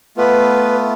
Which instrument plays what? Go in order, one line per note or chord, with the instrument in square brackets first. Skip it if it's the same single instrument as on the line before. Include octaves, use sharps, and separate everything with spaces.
[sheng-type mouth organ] A3 B3 F4 [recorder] B4